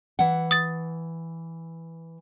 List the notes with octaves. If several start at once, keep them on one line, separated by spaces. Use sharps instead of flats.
E3 F#5
D#6 A6